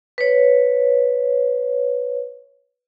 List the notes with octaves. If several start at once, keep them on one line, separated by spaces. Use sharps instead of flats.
B4 C#5